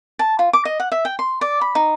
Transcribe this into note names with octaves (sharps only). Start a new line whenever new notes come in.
A5
F4
D6
D#5
F#5
E5
G5
C6
D5
B5
D#4